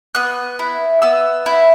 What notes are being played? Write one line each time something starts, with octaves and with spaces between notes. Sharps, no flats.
B3 F#6
E4
B3 E6
E4